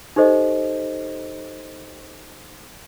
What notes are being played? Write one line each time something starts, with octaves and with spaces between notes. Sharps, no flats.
D#4 G4 A4 C5 D#5